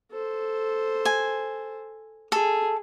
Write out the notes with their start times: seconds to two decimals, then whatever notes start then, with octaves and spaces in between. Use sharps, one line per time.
0.11 A4 C5
1.05 G#5
2.32 G#4 A4